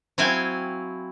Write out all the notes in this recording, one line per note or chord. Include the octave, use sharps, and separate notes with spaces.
F#3 C4 E4 F5 G5 G#5